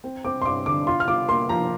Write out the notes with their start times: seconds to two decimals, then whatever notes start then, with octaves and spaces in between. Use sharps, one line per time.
0.04 C4
0.25 C4 D6
0.42 C6
0.45 G2 D6
0.66 D3 D6
0.87 F4 C6
1.00 F6
1.08 F4 D6
1.28 A#3 C6
1.49 F3 A#5